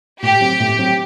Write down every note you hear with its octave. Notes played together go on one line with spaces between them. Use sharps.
A2 G4
F#3 C4
A2
F#3 C4